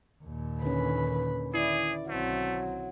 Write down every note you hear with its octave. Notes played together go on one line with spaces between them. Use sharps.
D#2 A#2
D3 D#3 C#4 B4
E4 G#4 D5
B1 F#3 A3 C4